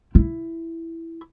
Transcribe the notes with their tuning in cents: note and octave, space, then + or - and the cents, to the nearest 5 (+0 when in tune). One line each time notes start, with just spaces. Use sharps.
E4 +0